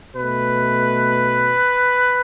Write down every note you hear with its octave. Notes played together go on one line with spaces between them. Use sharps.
B2 A3 B4